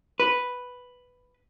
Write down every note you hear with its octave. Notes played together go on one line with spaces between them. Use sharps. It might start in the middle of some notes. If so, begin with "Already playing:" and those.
B4